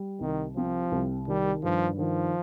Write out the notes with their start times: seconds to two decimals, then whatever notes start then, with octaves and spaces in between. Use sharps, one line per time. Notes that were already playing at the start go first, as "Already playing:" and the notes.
Already playing: G3
0.21 C2 D#3
0.56 F3 C4
0.92 C2
1.28 D#3 G3
1.63 G2 F3
1.98 D#3 F3